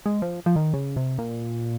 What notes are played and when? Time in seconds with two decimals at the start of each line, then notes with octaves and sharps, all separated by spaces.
0.06 G#3
0.22 F3
0.46 F3
0.56 D#3
0.74 C#3
0.96 C3
1.18 A#2